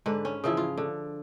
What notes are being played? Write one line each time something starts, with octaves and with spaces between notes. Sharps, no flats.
G#2 D3 B4
C#4
C#3 E3 F3 E4
F4
D3